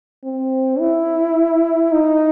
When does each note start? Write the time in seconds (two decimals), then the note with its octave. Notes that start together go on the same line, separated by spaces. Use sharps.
0.25 C4
0.80 E4
1.92 D#4